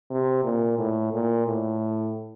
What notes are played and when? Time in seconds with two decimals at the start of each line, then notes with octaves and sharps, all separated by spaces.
0.10 C3
0.44 A#2
0.78 A2
1.12 A#2
1.46 A2